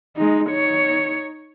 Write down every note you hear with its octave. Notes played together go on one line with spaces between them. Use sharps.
G#3 D#4
D#4 C#5